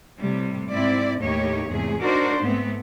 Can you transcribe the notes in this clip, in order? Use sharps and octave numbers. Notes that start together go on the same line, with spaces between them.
A2 C3 G3
G#2 C4 E4 D5
D#2 A2 A#3 D#4 G4 C#5
E2 G#2 C3 A3 G#4
D4 D#4 F#4 A#4 C5 D5
G#2 A3 B3 C4